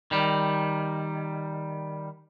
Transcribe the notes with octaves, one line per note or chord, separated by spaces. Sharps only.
D#3 G3